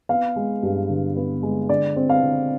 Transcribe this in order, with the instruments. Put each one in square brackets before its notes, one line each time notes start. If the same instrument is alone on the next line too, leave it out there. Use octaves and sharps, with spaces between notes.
[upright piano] B3 F5
G#3
G2
D3
B3
G#3
D3 D5
C4
F5
D3